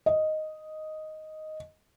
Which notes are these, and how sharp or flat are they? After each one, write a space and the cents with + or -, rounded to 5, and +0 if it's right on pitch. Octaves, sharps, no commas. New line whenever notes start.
D#5 +0